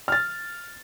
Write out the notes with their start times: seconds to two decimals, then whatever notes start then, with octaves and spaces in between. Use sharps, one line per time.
0.08 F6 A6